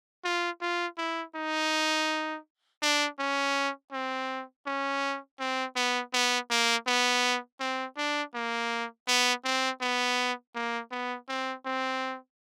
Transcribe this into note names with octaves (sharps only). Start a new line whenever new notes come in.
F4
F4
E4
D#4
D4
C#4
C4
C#4
C4
B3
B3
A#3
B3
C4
D4
A#3
B3
C4
B3
A#3
B3
C4
C4